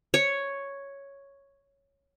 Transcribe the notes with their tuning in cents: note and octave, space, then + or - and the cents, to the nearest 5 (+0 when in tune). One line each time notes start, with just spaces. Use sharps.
C#5 +0